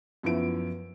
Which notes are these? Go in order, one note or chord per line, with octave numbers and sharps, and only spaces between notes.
F#2 F3 B3 E4 D7